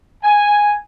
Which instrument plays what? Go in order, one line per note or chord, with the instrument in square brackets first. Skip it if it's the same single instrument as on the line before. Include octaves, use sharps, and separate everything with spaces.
[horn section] G#5